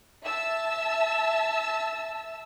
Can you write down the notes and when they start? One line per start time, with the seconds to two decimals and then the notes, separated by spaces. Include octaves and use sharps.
0.23 E5 A5 E6